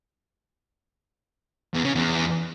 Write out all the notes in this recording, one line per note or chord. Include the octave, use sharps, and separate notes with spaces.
E2
C#3
E2